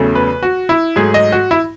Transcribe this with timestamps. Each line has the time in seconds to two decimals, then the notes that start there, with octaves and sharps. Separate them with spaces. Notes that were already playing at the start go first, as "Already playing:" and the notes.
Already playing: E2 C#3 F#3 A3
0.15 B4
0.43 F#4
0.69 E4
0.96 G#2 F#3 A3 G#4
1.14 D#5
1.32 F#4
1.51 E4